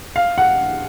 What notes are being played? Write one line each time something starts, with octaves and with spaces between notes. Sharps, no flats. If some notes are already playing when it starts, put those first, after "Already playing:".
F5
F#5